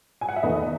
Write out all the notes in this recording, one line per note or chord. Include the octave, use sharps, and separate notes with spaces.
G#5
F#5
E5
E2 D#3 A3 B4 D#5